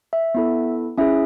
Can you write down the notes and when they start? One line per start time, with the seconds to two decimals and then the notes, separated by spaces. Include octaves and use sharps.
0.13 E5
0.35 B3 E4 A4
0.98 C#4 E4 G#4 E5